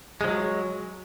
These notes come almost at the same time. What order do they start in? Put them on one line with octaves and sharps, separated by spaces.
G#3 F3 F#3